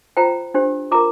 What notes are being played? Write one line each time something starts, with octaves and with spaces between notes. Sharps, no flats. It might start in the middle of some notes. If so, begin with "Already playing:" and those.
F4 C5 G5 A#5
D4 G4 C5
F4 A#4 A#5 D6